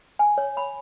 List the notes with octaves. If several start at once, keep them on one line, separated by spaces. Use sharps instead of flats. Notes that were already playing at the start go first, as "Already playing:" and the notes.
G#5
C#5
B5